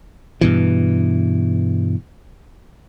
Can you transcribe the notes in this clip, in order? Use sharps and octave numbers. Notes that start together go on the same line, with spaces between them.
G2 B2 E3